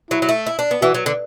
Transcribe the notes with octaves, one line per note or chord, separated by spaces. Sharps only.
F#3 E4
F#3
A3
E4
D4
B3
E3 F#4
F#3
D3